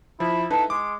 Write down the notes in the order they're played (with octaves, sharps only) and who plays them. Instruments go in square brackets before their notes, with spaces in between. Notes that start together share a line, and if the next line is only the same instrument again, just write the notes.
[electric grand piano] F3 [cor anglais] E4
[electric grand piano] D#4 E4 B4 [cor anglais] A4
[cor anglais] G#3 [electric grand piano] D6